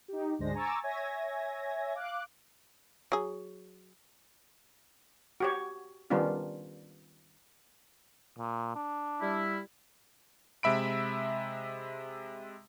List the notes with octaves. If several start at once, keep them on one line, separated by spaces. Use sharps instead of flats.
D#4 G4
D2 G#2 G#3 D4 C5 A#6
G#5 A#5 C#6 D6 E6 A6
C#5 E5 G#5 G#6 A#6
F5 D6 F#6
F#3 G#4
F#4 G4 C#5
D#3 G3 B3 C#4 D4 F4
A#2
D4
G3 E4
C3 G#3 E5 B5 D7